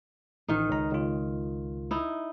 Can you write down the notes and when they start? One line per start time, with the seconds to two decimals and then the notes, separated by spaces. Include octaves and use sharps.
0.48 A1 D#3 D#4
0.70 C#2 A#5
0.91 C#2 F4
1.91 D#4 E4